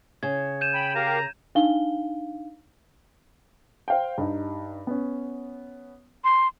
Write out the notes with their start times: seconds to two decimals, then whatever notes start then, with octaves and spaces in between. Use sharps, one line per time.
0.23 C#3 G#6
0.61 G6 D#7 E7
0.74 G5 B5
0.95 G4 A#4 F5 A#5
1.55 D4 D#4 F5 G7
3.88 C5 F5 G5
4.18 G2 D#4
4.87 B3 C#4
6.24 C6